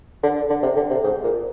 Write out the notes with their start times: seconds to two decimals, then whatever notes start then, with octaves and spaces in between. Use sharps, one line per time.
0.23 D3
0.49 D3
0.62 C3
0.76 D3
0.90 C3
1.03 G#2
1.24 A#2